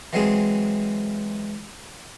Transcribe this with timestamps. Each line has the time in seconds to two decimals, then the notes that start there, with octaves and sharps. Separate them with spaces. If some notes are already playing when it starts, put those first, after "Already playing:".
0.13 E3 F#3 G#3 C4 G#4